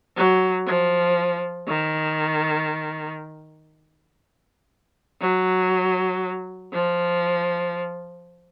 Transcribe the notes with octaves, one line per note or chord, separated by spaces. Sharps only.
F#3
F3
D#3
F#3
F3